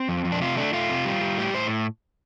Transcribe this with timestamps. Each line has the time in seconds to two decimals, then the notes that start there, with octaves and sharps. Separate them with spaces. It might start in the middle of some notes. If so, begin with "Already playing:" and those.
Already playing: C4
0.09 F2
0.25 F2
0.32 D4
0.41 C3 F4
0.57 A3 D4
0.73 A3 F4
0.90 C3
1.05 G3
1.21 G3
1.38 A2 G4
1.54 A2 C5